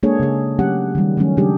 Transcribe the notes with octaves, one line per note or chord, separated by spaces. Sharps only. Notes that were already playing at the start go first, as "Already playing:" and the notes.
G#3 A#3 D4 G#4 A4 C#5
C#3 G#4
F#3 A3 C#4 G4 F#5
D#3 G3
D#3 F#3 G3 A3 C#4
C#3 F#3 G#3 D4 G4 G#4